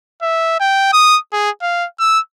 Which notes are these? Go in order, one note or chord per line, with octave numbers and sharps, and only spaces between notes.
E5
G5
D#6
G#4
F5
E6